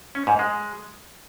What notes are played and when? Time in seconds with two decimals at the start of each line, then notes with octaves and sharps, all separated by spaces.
0.15 C#4
0.27 G#2
0.39 G#3